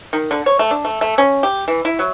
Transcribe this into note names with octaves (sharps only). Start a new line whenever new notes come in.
D#3
D3
C#5
A3
D4
A3
A3
C#4
G4
E3
E4
F#3